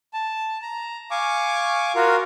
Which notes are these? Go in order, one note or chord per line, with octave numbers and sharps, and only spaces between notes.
A5
A#5
F5 G#5 C#6 D6
F4 F#4 A#4 F5